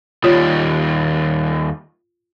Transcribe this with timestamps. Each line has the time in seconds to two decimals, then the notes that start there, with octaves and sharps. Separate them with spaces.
0.24 D#2 G3 F4 C#5